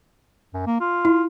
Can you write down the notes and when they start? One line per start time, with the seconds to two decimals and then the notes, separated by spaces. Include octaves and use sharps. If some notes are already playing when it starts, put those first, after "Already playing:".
0.54 F#2
0.66 A#3
0.80 F4
1.05 E4